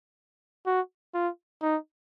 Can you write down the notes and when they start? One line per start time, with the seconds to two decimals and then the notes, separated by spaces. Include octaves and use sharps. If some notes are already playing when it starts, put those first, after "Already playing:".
0.66 F#4
1.14 F4
1.62 D#4